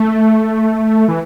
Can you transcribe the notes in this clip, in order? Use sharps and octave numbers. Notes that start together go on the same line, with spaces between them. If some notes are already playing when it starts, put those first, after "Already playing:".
Already playing: A3
E3